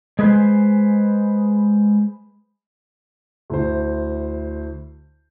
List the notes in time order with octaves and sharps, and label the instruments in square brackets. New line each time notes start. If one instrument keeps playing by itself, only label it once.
[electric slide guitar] G#3 G#4 B4 C5
[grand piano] D2 E4 C5